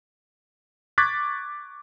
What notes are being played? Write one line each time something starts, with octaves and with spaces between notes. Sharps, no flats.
C#6 D6 F#6 G#6 A6 B6